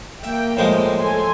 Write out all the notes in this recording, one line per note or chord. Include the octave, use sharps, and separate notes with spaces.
A#3 E5 G5
A2 F3 G#3
A4 G#5 C6